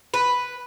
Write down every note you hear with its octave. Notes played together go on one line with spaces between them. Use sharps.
B4